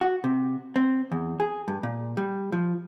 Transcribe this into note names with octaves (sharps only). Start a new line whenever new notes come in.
F#4
C3
C4
E2
G#4
G2
A#2
G3
F3